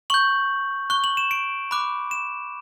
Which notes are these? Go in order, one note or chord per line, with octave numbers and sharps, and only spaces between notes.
C#6 G6 F#7
C#6 F#6 G7
F#7
E7
D7
B5 D6 F#6
E7